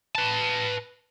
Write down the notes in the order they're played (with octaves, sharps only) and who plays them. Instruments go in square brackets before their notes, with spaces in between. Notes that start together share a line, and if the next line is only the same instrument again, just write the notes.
[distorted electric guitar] B4 A5